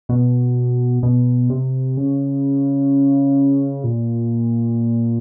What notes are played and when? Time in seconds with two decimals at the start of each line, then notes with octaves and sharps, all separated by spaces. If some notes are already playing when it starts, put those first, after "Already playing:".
0.09 B2
1.03 B2
1.50 C3
1.97 C#3
3.84 A#2